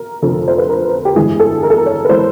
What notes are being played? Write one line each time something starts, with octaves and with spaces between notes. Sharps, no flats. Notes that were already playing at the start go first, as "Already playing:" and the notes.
Already playing: A#4
F1 F2 D3 A4
C5
B4
A#4
G4
G1 G2 E3 G#3 G#4
A4
A#4
A4
A#4
C#5
B4
E3 G#3 C5